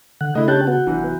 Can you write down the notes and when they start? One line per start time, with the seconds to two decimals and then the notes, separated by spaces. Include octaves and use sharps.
0.21 D3 F#5
0.35 C#3 A3 D4 E4 D#5
0.48 C#4 G4 A5 F#6 G6
0.67 B3 F#4
0.87 F1 E3 F#3